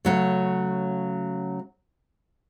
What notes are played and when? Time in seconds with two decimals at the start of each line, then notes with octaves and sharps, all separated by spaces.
0.05 C#3 F#3 A3